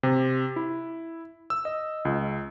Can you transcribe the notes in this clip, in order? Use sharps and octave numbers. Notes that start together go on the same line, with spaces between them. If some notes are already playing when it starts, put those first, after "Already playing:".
C3
E4
E6
D#5
C#2